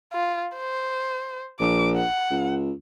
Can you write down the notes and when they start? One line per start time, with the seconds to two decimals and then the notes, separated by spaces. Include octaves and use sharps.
0.13 F4
0.56 C5
1.60 A#1 D6
1.97 F#5
2.30 C#2